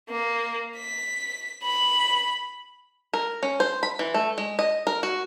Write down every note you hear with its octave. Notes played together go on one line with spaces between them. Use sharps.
A#3
B6
B5
A#4
C#4
C5
B5
E3
A3
G#3
D#5
A#4
F#4